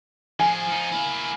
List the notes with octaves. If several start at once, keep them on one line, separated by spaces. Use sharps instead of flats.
F3 G#4 G#5
F3 D#4
A#3 E4